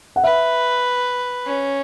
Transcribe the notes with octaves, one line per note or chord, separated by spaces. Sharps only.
F#5
B4 E5
C#4